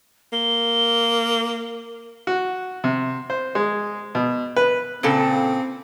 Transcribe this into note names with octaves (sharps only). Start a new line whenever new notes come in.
A#3 G7
F#4
C3
C5
G#3
B2
B4
A#2 C#3 C4 A4